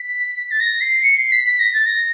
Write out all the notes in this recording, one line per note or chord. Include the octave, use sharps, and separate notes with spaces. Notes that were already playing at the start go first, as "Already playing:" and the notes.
Already playing: B6
A6
A#6
C7
C#7
C7
B6
B6
A#6
A6
A#6